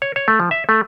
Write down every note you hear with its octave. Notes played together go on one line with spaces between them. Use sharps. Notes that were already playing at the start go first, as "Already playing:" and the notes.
C#5
C#5
A3
F3
E5
A3